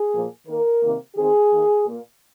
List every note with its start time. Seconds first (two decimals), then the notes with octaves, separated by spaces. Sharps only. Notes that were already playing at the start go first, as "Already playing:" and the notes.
Already playing: G#4
0.12 A#2 F3 A#3
0.47 D#3 A#3 A#4
0.82 C3 D#3 A#3
1.16 D#3 C4 G#4
1.51 D#3 A#3
1.85 A#2 A#3